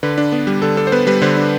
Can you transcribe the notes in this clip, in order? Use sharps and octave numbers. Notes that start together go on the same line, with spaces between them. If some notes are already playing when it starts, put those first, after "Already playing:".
D3 B4
D4
B3
G3
D3 A4
D4 A4
C5
B3 B4
G3 B4
D3 C5
D4